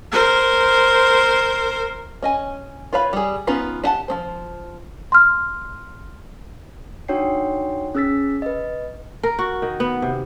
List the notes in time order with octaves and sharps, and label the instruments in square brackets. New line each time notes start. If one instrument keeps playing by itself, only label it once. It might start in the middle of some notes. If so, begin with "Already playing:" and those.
[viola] A#4 C5
[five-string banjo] C#4 D#5 G#5
F4 B4 C#5 F5 B5
G3 G#4
B3 C#4 D#4 F4 B4
D4 G4 F#5 A5
F3 C4 C5
[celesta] C6 F6
[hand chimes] D4 D#4 F#4 C#5 G5 C7
C#4 G#4 E6 A6 B6
B4 D#5
[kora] A#4
F#4
D#3
B3
C3